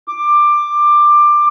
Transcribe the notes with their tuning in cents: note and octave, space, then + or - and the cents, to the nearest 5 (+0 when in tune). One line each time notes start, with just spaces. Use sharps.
D6 +15